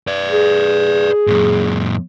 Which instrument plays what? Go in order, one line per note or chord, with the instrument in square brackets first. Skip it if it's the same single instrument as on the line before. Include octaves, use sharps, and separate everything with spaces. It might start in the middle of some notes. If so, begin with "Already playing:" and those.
[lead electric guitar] B4 D5
[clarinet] G#4
[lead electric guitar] F#2 A#2